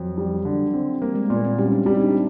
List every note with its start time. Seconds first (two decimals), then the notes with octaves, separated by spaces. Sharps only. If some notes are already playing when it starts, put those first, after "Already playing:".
Already playing: F2 F#3
0.18 G3
0.45 D3
0.74 C4
1.02 G3 A#3
1.15 G#3
1.30 A#2 B3
1.44 C4
1.58 G3 C#4
1.72 D4
1.86 G3 C4
1.95 D#4
2.00 D4
2.11 E4